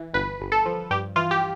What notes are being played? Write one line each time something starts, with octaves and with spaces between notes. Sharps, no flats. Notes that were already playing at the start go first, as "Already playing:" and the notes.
Already playing: E3
G1 B4
G1
A4
F3
G2 G4
E3 F4
G4